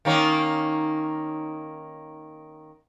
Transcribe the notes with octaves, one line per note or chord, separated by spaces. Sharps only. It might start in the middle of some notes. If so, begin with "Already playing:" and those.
D#3 A#3 C#4